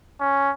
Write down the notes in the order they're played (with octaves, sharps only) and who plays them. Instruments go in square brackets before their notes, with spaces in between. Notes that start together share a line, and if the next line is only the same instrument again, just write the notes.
[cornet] C#4